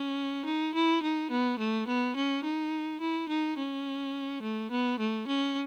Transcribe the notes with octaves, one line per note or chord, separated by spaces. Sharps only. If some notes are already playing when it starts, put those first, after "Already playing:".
Already playing: C#4
D#4
E4
D#4
B3
A3
B3
C#4
D#4
E4
D#4
C#4
A3
B3
A3
C#4